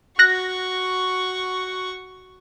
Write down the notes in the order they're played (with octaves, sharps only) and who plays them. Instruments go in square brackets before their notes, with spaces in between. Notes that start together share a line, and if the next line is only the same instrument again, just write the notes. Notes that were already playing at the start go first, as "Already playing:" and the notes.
[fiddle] F#4 C#6 [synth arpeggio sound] F#6 A#6